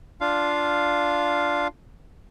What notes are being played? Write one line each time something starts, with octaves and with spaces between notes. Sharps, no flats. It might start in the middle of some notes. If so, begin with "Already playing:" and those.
D4 F4 F5